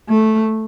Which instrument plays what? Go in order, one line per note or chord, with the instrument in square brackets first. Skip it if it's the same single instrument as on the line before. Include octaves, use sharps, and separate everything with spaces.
[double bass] A3